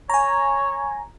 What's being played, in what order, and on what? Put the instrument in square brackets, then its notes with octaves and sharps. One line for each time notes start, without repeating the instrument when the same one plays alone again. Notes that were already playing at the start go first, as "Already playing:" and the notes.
[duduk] C#5 [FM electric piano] G#5 A#5